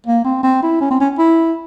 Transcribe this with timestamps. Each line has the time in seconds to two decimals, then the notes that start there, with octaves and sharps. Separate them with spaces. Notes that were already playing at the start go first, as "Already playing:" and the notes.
0.06 A#3
0.24 C4
0.43 C4
0.63 E4
0.81 C#4
0.91 C4
1.00 C#4
1.18 E4